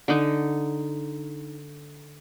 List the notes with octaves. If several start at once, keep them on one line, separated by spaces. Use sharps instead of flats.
D3 D#4